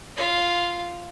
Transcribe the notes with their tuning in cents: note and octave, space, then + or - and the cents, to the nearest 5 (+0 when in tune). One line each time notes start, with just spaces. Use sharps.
F4 -10 F5 +0